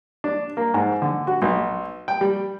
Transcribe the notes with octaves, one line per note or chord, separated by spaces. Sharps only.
D4
A#3
G#2
D3
F#4
B1
G5
G3